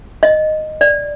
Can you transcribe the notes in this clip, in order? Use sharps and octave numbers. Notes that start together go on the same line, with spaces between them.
D#5
D5